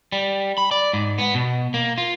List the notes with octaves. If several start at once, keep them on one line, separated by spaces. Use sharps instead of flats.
G3
B5
D5
G#2
B3
B2
A#3
F4